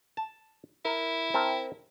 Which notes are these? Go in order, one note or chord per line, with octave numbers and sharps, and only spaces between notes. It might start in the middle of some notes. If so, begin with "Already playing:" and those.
A5
E4 A#4
C4 A#4 A5